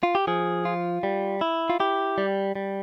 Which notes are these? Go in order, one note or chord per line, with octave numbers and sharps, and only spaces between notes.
F4
G4
F3 G#4
F4
G3
E4
F4
E4 G4
G3
G3